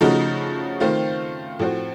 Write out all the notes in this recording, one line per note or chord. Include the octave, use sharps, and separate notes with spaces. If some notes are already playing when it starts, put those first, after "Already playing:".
C#3 F3 A3 D#4 F#4
D#3 A3 C4 F4 C5
A2 F3 C4 F#4